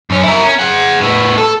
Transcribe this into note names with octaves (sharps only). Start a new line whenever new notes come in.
F#2 C#4
E4 A#4
C#4
G#4 F#5
A2 B3
A4